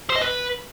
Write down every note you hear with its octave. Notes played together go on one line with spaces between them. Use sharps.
C5
D#5
B4